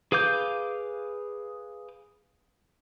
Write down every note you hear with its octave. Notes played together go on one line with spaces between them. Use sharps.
G#4 B4 F5 D6 G6